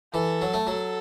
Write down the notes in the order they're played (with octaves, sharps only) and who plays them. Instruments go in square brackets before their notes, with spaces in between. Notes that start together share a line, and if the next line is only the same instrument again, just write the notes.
[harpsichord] E3 [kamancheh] A4
[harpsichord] F#3
A3
[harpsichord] F#3 [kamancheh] A4